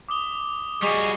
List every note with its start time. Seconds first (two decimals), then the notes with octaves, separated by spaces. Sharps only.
0.09 D6 D#6 G7
0.83 G3 F#4 G#4 D#5 C#6